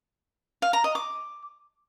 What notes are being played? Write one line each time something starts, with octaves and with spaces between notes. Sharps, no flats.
F5
A#5
D#5
D6